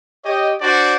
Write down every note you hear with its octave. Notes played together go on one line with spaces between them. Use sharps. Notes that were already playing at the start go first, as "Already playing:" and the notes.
G4 C#5 D#5
D4 F#4 C5 D5